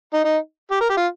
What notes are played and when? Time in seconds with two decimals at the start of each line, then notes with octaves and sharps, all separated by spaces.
0.13 D#4
0.25 D#4
0.71 G4
0.81 A#4
0.90 G4
0.97 F4